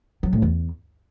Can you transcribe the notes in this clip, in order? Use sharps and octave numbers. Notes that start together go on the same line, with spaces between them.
F#3
A2
E2